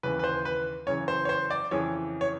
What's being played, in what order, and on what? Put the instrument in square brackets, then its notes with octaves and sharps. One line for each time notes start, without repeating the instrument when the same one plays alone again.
[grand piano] D#2 C#3 E3 B4
B4
C5
B4
F#2 C#3 E3 C#5
C5
C#5
C5
D5
F2 C#3 E3 C#5
C#5